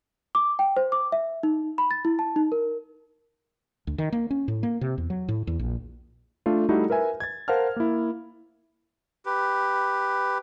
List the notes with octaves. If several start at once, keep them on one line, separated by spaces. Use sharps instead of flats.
D6
G5
C5
D6
E5
D#4
B5
A6
E4
A5
D#4
A#4
D2
D#3
A#3
C#4
A2
A#3
C3
E2
F#3
A2
E2
A#1
A3 D4 F4
G3 A3 D#4 E4 F#4
A#4 B4 E5 G#5
G#6 A6
A#4 C5 F5 F#5 A5 F6
A#3 E4
G4 B4